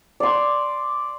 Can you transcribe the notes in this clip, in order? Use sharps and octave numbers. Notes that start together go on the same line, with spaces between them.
D5 C6